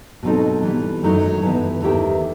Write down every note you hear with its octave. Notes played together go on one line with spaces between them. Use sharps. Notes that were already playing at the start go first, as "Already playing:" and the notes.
B2 F#3 C4 D#4 A4
E3 G3 B3
F#2 D#3 F#3 A3 D#4
G2 E3 B3
E2 D#3 A3 E4 G4